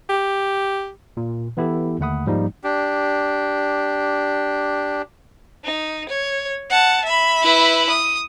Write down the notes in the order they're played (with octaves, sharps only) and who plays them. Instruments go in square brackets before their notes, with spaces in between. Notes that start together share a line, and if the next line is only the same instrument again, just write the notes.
[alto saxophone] G4
[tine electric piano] A#2
E3 B3 E4 G4 A4
D#2 D3 A3 F#5 B5 D#6
G#2 F3 G3 A#3 D#4
[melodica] D4 G4
[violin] D#4
C#5
F#5 A5
E5 B5
[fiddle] E4 B4
D#6